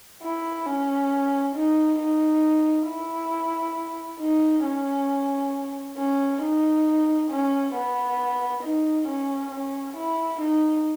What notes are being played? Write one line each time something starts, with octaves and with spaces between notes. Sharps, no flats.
E4
C#4
D#4
D#4
E4
D#4
C#4
C#4
D#4
C#4
B3
D#4
C#4
C#4
E4
D#4